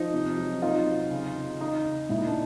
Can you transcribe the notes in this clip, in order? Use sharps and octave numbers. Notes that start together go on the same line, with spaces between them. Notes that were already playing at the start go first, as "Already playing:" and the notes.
Already playing: F3 D#4
C3
F#3
F#3 D#4 F4
C3
C#3
C#3
C#3 D#4
C#3
A#2 E4
D#4
D4